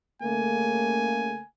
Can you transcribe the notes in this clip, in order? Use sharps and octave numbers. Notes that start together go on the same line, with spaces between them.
C#3 A3 A#3 G#5